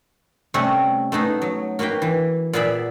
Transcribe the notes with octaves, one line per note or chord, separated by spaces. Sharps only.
C3 G3 A3 C#4 C#5 F#5
A3 B3 D#4 G#4
F#3
A#3 F#4 B4 F5 G5
E3
A#2 B3 G#4 D5 E5 B5